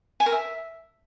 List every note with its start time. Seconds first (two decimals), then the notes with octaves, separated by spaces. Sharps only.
0.20 G#5
0.26 A#4
0.32 E5